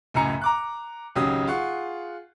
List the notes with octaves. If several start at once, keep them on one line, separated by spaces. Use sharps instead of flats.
C#2 F#2 A2 G#5 A#5 C#7
A#5 D6 F#6
G#1 C#2 C#3 F#3 G4 D#6
F4 G#4 F#5 C#6